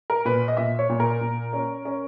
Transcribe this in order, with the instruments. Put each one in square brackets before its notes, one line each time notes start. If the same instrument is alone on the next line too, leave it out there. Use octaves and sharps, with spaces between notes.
[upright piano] A#4
A#2 B4
D#5
A#2 E5
C#5
A#2
A#4
A#2
C#4
C#4